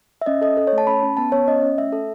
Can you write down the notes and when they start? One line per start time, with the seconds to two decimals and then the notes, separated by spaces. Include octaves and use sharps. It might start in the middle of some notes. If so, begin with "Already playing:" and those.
0.22 E5
0.26 C#4 D#5
0.41 A4 D#5
0.57 A4
0.67 C#5
0.73 A3
0.78 A5
0.87 C#4 B5
1.03 C#4
1.17 B3 A5
1.32 B3 C#5
1.48 C#4 D#5
1.62 C#4
1.78 A3 E5
1.92 A4